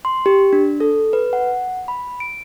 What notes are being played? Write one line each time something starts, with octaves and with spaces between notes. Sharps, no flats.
C6
G4
D4
A4
B4
F#5
B5
D7